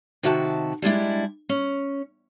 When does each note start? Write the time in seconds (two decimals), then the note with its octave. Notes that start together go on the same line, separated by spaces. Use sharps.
0.23 C3 D#3 F#4 E5 G#5 A5
0.82 G3 G#3 D4 E4
1.49 C#4